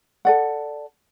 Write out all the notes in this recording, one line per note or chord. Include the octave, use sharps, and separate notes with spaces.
A4 D5 F#5